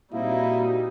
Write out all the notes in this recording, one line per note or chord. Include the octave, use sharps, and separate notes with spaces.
A#2 G3 A#3 C4 D#4 E4 F#4